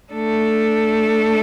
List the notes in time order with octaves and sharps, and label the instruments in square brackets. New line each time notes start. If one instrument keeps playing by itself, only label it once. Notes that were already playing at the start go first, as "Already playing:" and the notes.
[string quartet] A3 D4 A4